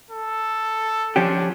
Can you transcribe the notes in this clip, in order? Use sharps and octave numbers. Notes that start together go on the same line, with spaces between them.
A4
F3 C#4 D4 G4